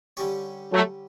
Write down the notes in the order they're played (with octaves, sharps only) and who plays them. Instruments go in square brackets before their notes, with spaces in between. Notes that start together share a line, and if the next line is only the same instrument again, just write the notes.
[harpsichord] D3 G3 C#4 G4 C#5
[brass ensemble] F#3 A3